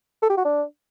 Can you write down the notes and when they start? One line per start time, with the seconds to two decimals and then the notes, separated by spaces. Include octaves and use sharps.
0.22 A4
0.30 G4
0.37 F#4
0.45 D4